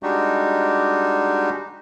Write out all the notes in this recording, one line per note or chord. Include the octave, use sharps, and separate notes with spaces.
G3 G#3 D4 D#4 F#4 G4